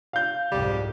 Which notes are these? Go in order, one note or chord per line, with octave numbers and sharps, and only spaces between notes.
F5 G6
C2 F2 G#2 G3